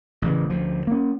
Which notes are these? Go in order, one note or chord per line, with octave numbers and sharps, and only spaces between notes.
A1 C#3 E3
D2 F3
A#3 C#4